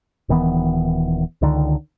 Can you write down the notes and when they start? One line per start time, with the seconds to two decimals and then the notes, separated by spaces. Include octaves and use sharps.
0.29 D#1 D#3 E3 B3
1.42 C#2 D3 D#3